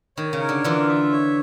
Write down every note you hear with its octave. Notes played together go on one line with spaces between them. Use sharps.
D#3 C#5
C#3
A#4
D3
D3 E3 F4
E5
C#5